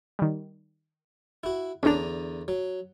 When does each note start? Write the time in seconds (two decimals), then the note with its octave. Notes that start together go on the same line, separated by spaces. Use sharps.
0.19 D#3 G3
1.44 E4 F#4
1.83 E2 D3 C#4 D4 A#5
2.48 F#3